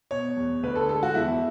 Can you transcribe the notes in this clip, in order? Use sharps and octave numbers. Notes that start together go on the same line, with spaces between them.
B2 C#5
E2
D2 B4
A4
G#3 A4
F#4
E2 E4